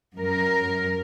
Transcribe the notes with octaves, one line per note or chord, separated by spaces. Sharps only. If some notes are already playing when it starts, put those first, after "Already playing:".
F#2 A#4